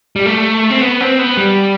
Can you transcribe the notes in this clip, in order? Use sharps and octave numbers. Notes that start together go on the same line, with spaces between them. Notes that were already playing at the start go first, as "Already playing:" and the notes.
G3
A3
C4
B3
C4
B3
G3